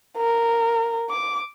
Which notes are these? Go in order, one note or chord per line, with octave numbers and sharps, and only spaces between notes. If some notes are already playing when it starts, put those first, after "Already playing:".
A#4
D6